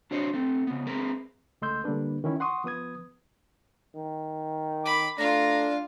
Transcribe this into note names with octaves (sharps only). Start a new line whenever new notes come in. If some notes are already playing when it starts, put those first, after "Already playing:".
D4 F#4 C5 C#5 D#5
A3 C4
C#3 B3
C4 G#4 A#4 B4
C#2 A3 D#5 C6 E6 G6
D3 G3 A#3 D4 B4
D#3 C#4 E4
F#5 C6 C#6 D#6
F3 B3 B4 D#6 G#6
D#3
B5 D6
A3 D4 F4 F5 A#5